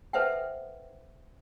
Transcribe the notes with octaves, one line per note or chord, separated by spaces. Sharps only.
A4 B4 C5 E5 F#5 G5